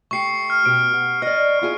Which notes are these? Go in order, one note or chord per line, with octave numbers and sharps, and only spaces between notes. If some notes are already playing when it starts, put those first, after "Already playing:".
A3 G4 C#6 C7 C#7
F6
B2 G4 D7
F#5
D5 D#5 F6
E4 F4 G#4